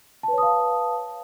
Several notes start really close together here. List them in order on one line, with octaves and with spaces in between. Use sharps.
A5 B4 C#5 D#6 F5